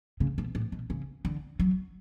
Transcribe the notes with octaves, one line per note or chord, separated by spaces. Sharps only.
C#3
B2
A2
B2
C#3
D3
F#3